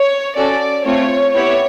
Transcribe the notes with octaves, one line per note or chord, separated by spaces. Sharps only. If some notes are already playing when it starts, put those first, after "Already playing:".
Already playing: C#5
C#4 F#4 A4 D5
A3 C4 F4 C#5
B3 E4 G4 C#5